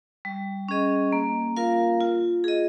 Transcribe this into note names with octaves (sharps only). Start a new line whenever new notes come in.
G3
C#4 G#4 D#5
A#3
F4 A#4 F5
F4
G#4 D#5